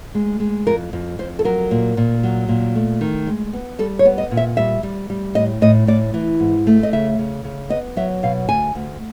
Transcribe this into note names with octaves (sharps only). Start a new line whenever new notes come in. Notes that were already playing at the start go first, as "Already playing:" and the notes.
G#3
G#3
F2 A#4
F2
F2 C5
A4
F#3 A#4
A#2
A#2
F#3
A#2
A3
D#3
G#3
B3
G3 A4
C#5
B3
D#5
A#2
E5
G3 E5
G3
G3
A2 D#5
A2 D#5
A2 D5
E3
G#2
A3
D#5
C#3 E5
C#3
C#3
B3 D#5
F#3 E5
B2 F5
D2 G#5
D2